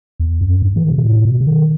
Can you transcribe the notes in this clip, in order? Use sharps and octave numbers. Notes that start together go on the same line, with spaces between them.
E2
F#2
G2
E3
D#3
C3
B2
A2
B2
C3
D#3